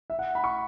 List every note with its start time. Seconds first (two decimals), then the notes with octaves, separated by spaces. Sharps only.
0.10 E5
0.19 F#5
0.35 B5
0.44 C#6